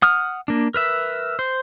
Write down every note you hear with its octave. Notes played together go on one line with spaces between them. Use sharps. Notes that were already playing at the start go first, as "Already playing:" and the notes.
F#5 D#6 F6
A#3 D4
A#4 B4 E5
C5